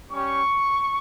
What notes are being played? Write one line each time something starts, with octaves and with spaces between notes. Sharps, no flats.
G3 C#4 G4 C#6